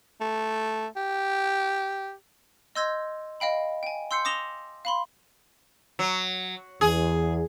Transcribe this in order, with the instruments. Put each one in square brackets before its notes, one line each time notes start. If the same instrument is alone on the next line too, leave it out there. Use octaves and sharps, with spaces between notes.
[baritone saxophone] A3
G4
[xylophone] D#5 C6 E6 G6 G#6 A#6
D#5 F5 G5 B5
G5 G#5
C6 E6 G6 C7 C#7
D6 D#6 A#6 E7 F7 G7
F5 B5 C6
[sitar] F#3
[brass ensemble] E2 [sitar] G#4